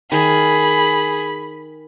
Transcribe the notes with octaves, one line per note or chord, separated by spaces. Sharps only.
D#3 G#4 B5